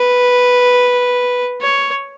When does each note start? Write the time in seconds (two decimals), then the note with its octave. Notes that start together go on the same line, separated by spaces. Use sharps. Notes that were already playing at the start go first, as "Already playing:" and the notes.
Already playing: B4
1.61 C#5